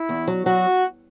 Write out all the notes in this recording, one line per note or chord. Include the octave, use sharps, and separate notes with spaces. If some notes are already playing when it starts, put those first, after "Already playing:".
Already playing: E4
E2
F#3
F#3 F#4